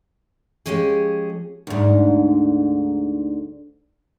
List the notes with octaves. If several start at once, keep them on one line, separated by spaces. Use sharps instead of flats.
F3 F#3 G#3 C#4 G4 G#4
D2 G#2